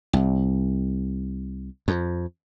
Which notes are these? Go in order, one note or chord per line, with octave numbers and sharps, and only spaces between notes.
C2
F2